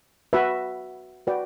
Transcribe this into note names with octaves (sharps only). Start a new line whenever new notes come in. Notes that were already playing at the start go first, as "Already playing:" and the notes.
F#4 B4 E5
F#4 B4 D5 G5